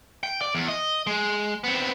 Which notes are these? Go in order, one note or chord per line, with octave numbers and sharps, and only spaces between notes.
G5
D5
E2
D#5
G#3
B3 C4